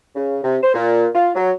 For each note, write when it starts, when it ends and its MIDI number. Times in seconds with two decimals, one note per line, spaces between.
0.16 0.37 49
0.44 0.57 48
0.62 0.70 72
0.74 1.06 46
1.15 1.29 65
1.35 1.51 54